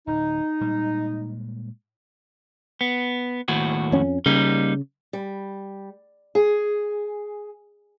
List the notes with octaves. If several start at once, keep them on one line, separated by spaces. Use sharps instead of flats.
D1 D#4
A#2 G3 G#3
B3
D#2 A2 F#4
F2 C#4
C#3 G3 A#3 D#4
G3
G#4